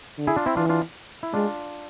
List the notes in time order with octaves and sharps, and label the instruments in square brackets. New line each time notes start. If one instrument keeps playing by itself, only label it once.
[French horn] D3
[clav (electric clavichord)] E4 G#4
D4 F4
C4 E4
[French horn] E3 [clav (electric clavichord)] D4 F4
[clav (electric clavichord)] D4 F4
E4
[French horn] G#3 [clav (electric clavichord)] D4 F4